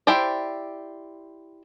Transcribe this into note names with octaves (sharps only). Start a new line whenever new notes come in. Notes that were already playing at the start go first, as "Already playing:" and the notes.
E4 G4 C5 D5